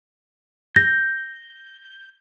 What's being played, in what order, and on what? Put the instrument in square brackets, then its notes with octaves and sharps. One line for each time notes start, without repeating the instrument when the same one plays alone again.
[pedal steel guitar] G6 [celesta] A#6